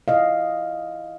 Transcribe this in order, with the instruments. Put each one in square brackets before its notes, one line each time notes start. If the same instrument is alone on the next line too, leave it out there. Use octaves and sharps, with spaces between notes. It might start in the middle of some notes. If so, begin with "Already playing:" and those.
[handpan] E4 D#5 F5